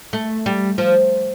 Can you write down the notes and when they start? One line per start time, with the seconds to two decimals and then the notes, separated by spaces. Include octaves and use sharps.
0.13 A3
0.46 G3
0.78 F3